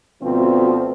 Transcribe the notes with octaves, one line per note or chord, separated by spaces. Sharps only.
D2 B2 F3 C4